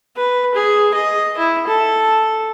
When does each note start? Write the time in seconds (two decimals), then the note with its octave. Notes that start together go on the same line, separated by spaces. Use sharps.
0.17 B4
0.55 G#4
0.95 D#5
1.38 E4
1.67 A4